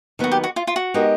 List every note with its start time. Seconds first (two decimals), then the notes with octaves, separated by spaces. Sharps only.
0.19 D#2 D#3 F#3 B3 F#4
0.32 G4
0.44 F#4
0.56 F4
0.67 F4
0.76 F#4
0.94 G#3 B3 D#4 G4 A#4